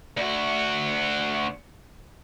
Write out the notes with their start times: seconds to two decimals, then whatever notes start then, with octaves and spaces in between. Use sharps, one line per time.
0.17 D2 F#4